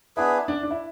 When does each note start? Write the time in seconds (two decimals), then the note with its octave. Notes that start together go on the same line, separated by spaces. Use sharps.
0.17 B3 D4 E4 G#4 B4
0.48 D4
0.63 D4
0.71 E4